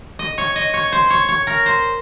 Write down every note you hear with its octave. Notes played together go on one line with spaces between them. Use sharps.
D#5
C#5
D#5
C#5
C5
C#5
C#5
A#4
C5